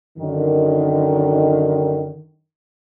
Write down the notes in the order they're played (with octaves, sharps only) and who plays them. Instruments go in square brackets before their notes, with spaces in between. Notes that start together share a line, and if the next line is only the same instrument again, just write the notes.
[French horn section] F#2 D3 D#3